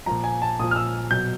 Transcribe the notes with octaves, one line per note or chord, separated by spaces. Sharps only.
A#2 F3 A#5
G#5
A5
A#2 F3 D#6
F6
E6
B2 F#3 G6